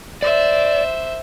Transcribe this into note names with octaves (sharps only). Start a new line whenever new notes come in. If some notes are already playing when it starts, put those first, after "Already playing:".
C5 D5 E5